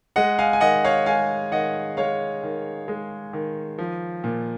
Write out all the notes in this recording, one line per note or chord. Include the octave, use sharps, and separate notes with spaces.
G#3 D#5 F#5
F5 G#5
G#5
D#3 D#5 F#5
C#5 F5
G#3 F5 G#5
D#3 D#5 F#5
G#3 C#5 F5
D#3
G#3
D#3
F3
A#2